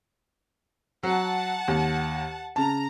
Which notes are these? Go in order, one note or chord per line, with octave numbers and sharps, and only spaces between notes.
F#3 F#5 A5
D#2
C#3 A5 A#5